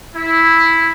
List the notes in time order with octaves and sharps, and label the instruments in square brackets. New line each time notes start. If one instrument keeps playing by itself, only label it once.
[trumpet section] E4